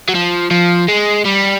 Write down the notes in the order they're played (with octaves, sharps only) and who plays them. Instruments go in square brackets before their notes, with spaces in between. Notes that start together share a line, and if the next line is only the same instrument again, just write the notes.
[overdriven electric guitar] F#3
F3
F3
G#3
G3